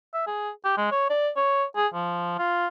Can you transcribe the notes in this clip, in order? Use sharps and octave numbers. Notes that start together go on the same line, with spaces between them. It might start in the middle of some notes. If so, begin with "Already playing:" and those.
E5
G#4
G4
G#3
C#5
D5
C#5
G#4
F3
F4